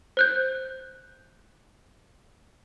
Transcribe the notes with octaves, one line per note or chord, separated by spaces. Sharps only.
C5 F#6 G6